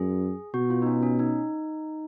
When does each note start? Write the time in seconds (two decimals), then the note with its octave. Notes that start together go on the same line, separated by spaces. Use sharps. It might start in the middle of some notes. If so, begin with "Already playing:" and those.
Already playing: F#2 G#4
0.54 B2 F#4
0.70 F4
0.82 D#4
0.86 C#4
1.03 C#4
1.19 D#4